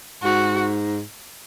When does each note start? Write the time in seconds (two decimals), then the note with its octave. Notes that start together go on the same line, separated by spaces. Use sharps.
0.23 G#2 F#4